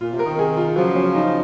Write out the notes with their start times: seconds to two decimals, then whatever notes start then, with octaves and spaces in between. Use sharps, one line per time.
0.01 A#2 F4
0.13 C3
0.19 A#4
0.25 C3 D#3
0.39 G#4
0.57 F4
0.76 C#3 F3 F#3
0.95 C#4
1.15 D#4